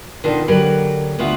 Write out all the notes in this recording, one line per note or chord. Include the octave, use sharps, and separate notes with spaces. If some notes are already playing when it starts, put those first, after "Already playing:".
B2 D#3 D4 F4 A4
D3 F#3 A#3 G4 A#4 B4
D2 B3 F4 F#4 E5 F#5